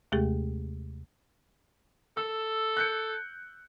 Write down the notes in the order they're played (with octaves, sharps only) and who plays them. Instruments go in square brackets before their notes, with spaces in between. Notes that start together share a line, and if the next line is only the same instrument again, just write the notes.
[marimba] D#2 C3 G#3 A3 G4 G#4
[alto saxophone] A4 [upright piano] E6
[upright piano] F#6 G6 C#7